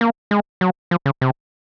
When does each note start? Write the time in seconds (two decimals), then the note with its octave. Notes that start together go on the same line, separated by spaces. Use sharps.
0.01 A#3
0.31 G#3
0.61 F#3
0.91 F3
1.06 C#3
1.21 C3